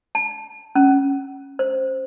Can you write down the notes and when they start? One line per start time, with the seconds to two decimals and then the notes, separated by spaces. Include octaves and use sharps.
0.15 A5
0.75 C#4
1.59 C5